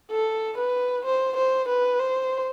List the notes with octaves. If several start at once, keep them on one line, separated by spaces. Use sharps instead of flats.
A4
B4
C5
C5
B4
C5